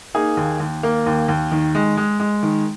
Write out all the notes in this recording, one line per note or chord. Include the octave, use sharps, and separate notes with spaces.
A#3 D#4 G#4
D#2
D#2
A#3
D#2
D#2
D#3
G#3
G#3
G#3
D#3